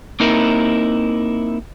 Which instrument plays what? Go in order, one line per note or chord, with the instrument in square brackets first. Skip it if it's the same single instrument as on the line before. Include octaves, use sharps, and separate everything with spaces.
[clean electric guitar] A#3 C4 D#4 E4 A#4